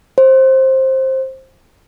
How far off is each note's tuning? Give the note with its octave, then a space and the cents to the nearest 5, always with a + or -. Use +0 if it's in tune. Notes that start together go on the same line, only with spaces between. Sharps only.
C5 +15